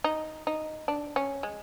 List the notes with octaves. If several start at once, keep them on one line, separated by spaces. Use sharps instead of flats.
D#4
D#4
D4
C#4
G#3